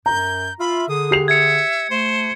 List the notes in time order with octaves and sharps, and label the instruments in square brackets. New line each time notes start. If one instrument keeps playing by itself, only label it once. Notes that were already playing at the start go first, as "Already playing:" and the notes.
[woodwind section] F#2 [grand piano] A#5 [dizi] G6
[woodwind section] F4 E5 [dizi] B5
[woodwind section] D3 G#4 [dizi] D#6
[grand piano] G4 C7 F7
[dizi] E5 [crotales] G#6 C#7
[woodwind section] A3 [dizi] C5